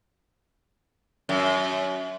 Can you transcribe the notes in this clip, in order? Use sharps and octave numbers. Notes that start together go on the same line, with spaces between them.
F#2